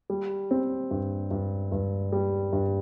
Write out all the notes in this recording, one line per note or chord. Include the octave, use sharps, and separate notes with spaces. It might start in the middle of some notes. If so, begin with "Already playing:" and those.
G3
C4
G2
G2
G2
G3
G2